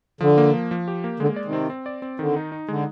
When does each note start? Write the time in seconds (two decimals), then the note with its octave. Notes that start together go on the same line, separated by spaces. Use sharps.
0.21 D3 F3
0.38 A#3
0.53 F3
0.71 F3
0.88 G4
1.04 A#3
1.20 D3 G#3
1.36 D5
1.45 C3 D#3
1.53 C4
1.70 C4
1.86 D5
2.02 C4
2.19 D3 D#3
2.36 D#4
2.52 D#4
2.68 D3 G#3